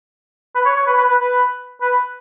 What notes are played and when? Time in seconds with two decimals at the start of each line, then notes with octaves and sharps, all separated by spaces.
0.55 B4
0.65 C#5
0.76 C#5
0.87 B4
0.98 B4
1.08 B4
1.19 B4
1.82 B4